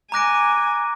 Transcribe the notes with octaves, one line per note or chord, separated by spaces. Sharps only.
G#5 A#5 D6 F#6 A#6 D7